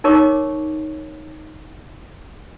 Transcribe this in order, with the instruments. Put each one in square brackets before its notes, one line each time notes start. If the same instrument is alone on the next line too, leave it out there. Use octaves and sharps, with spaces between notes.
[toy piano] D#4 A#4 C#5 C#6 D6